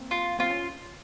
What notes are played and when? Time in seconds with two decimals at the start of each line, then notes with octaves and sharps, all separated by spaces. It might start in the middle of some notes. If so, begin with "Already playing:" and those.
Already playing: A#3 C4
0.11 F4
0.39 C4 F4
0.50 C#4